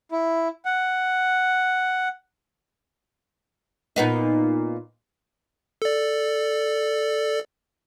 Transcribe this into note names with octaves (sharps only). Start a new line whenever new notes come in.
E4
F#5
A#2 B3 D#4
A4 D5